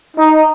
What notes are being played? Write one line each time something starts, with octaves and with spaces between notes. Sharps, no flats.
D#4